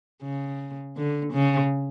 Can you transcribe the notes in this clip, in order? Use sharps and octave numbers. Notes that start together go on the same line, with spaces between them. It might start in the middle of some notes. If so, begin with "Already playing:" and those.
C#3
D3
C#3